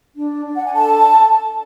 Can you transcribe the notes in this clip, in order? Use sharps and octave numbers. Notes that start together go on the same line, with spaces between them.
D4
D4
F#5
G#5
A4 A5